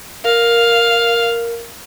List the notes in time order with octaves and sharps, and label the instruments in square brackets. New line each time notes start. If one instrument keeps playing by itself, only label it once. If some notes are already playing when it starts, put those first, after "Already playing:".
[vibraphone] A#4 [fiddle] F5